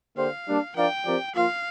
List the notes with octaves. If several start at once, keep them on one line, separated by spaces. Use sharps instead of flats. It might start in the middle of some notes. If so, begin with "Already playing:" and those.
D3 A#3 G4 C5 F5
G3 A#3 D4
F3 D4 A#4 D5 F5 G5
F3 C4 G4 A#4 D5
F3 A#3 F4 F5